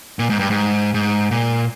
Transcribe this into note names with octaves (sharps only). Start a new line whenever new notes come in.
A#2
G#2
G2
G#2
G#2
A#2